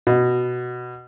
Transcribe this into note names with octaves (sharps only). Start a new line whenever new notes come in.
B2